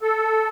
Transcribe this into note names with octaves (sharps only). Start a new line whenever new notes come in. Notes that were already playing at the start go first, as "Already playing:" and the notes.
A4